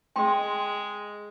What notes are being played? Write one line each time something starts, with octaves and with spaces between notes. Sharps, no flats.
G#3 G5 C6